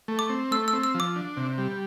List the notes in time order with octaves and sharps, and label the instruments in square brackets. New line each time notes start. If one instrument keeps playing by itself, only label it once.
[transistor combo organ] A3
[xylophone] D6
[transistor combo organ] C4
[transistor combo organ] A3 [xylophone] E6
[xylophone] E6
[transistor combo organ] C4
[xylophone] E6
[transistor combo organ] F3
[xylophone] D6
[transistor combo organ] D4
C3
G3